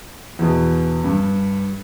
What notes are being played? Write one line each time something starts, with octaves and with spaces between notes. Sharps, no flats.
E2 B2
G2